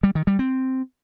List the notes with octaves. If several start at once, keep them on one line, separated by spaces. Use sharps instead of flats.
G3
D#3
G3
C4